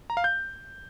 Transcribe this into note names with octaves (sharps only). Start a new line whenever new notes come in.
A#5
F5
G6